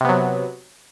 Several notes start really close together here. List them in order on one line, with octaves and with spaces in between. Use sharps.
C3 B3 F#3